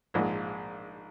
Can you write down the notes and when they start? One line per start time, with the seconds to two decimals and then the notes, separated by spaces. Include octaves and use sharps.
0.14 A#1 G#2 F3 G#3